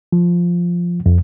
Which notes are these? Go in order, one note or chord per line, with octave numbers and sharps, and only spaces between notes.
F3
F2